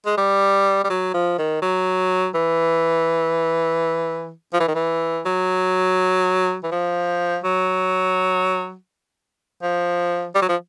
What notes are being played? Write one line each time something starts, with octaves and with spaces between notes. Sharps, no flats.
G#3
G3
G3
F#3
F3
D#3
F#3
E3
F3
E3
D#3
E3
F#3
E3
F3
F#3
F3
G3
F#3
F3